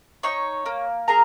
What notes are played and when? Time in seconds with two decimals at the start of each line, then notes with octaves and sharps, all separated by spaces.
0.23 D#4 C#5 C#6
0.66 A#3
1.08 G#4 A#4 A#5